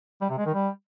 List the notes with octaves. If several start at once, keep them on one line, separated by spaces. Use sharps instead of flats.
G3
C3
G#3
D#3
G3